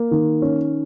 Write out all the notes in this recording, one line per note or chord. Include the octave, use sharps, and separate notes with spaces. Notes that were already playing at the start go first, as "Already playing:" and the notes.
Already playing: A#3
D#3
C#4